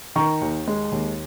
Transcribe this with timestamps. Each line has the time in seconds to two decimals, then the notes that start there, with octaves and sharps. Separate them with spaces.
0.16 D#3 A#5 C#6
0.41 D#2
0.68 G#3
0.92 D#2